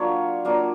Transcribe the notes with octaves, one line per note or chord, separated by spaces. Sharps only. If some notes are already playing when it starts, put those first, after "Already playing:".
Already playing: F#3 A#3 D4 F4 C#5
F#3 A#3 D4 F4